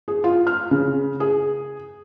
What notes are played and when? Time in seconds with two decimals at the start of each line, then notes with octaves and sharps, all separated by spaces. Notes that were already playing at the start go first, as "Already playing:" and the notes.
0.08 G#4
0.24 F4
0.47 F6
0.71 C#3
1.20 G#4